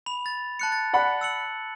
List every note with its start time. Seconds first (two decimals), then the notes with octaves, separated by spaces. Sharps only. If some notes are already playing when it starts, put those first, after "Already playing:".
0.06 B5 F7
0.26 A6
0.59 A5 F#6 C#7
0.72 A6
0.93 D5 F#5 B5
1.21 E6 C#7 F#7